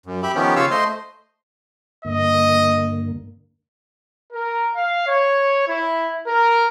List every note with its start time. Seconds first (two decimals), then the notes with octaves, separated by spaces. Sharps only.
0.06 F#2
0.23 G4 E5 B5
0.35 D#3 F3 B3 C#4 G4
0.56 C#3 F4 C#5 F5 E6
0.71 A3 C5 D#5 C6
2.05 G2 D3 A#3 D#5
4.33 A#4
4.74 F5
5.07 C#5
5.68 E4
6.25 A#4